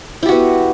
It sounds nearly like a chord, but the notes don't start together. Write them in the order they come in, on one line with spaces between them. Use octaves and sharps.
E4 G4 F#4 B3